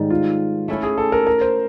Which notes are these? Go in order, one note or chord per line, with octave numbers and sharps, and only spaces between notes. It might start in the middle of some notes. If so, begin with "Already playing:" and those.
Already playing: G#2 D#3 G3
F4
A3 C#4 E4
G#4
A4
A#4
A#4
C5